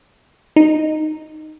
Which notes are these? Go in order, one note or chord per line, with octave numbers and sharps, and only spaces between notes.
D#4